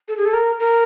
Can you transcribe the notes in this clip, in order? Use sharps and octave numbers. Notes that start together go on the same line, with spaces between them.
A4
G#4
A4
A#4
A#4